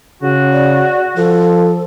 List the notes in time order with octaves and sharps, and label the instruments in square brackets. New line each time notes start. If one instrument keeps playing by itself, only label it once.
[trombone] C#3 [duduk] F#4
[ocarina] D5
[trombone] F3 [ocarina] A4